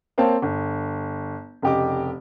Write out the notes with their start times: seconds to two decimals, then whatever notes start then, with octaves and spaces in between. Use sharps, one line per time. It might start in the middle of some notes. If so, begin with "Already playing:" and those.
0.18 A#3 C4 C#5 F5 G5 A5
0.42 G1
1.62 F1 C#3 G4 D#5 D6